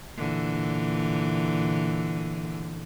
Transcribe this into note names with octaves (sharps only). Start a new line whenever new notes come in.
A#2 D3 E3